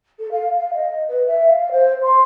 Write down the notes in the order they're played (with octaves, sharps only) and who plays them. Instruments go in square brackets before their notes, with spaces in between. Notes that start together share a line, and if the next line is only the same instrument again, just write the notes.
[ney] A4
F5
F5
D#5
B4
E5
F5
C5
C6